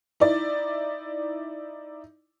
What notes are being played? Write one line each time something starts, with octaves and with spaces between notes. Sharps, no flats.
D#4 E4 D5